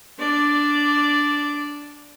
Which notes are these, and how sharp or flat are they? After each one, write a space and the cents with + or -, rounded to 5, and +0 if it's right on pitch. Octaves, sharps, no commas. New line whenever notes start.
D4 -10 D5 +0